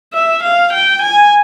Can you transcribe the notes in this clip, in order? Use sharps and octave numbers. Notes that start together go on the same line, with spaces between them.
E5
F5
G5
G#5